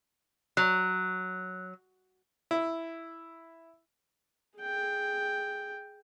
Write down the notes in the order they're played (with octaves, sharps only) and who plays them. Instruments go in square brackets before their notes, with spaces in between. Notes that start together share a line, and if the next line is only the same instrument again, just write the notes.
[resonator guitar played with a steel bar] F#3 [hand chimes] F#6
[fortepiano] E4
[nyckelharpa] G#4 G5